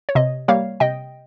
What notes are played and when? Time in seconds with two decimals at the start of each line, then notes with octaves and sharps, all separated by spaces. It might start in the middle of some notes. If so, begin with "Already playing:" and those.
0.09 C#5
0.15 C3 D#5
0.48 G3 A#3 C#5 F5
0.80 C3 D#5 G5